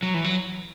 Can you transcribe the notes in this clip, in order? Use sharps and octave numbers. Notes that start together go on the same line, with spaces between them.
F#3
E3
F#3